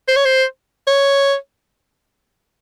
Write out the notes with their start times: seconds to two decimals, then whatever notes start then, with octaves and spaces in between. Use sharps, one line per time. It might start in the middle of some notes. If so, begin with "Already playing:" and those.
0.08 C5
0.16 C#5
0.25 C5
0.88 C#5